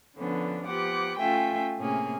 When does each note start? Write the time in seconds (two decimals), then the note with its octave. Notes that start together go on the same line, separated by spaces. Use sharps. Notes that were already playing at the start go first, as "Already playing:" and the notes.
0.17 D3 F3 B3 C#4 D4
0.65 F3 B3 G4 F#5 D6
1.18 A3 C#4 F4 E5 G5 G#5
1.77 A2 C3 A#3 C#4 G#4